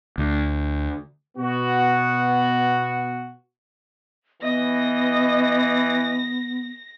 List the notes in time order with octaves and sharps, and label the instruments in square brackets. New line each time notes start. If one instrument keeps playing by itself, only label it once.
[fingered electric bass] D2
[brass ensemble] B2 B3 F#4
[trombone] E3 [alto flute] B3 [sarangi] D#5 [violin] A#6